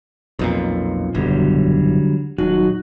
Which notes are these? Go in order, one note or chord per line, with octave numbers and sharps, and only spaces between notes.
B1 F2 A#2
F#1 B1 E2 D3 F#3 G3
D#1 F#3 D#4 F#4